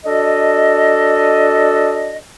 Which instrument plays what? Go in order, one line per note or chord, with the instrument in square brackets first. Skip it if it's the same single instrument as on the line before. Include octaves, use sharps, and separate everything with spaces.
[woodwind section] D4 F#4 A4 D#5